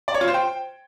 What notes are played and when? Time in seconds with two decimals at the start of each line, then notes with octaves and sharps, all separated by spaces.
0.08 D5
0.14 C#5
0.21 F4
0.28 C5
0.34 G5